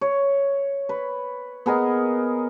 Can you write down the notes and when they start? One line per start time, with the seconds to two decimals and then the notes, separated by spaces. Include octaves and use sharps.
0.01 C#5
0.89 B4
1.66 B3 G#4 A#4 D#5